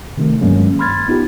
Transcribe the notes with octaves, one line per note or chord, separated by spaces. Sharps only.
C3 D#3 A3
G2 D#3 F#3 G#3 A#3 C#4
B5 C6 F6 G#6 A6
B3 D#4 F4 G4